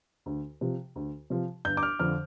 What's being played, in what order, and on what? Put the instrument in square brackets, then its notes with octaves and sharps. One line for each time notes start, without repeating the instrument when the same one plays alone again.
[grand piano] D2
C3 F3
D2
C3 F3
G1 G6
D6
F6
F2 D3 F3 F6